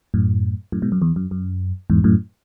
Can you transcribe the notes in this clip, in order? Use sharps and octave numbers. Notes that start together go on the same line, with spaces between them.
F#2 A2
F#2 A2
G#2 B2
F#2
E2
F#2
F#2
E2 G#2
F#2 A2